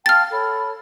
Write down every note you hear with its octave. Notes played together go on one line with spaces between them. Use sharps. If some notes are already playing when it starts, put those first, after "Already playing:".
F5 G5 A5 F6 A6
A4 C#5 B5